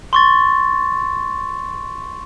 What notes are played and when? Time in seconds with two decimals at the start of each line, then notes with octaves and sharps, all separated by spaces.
0.13 C6 C#6 A6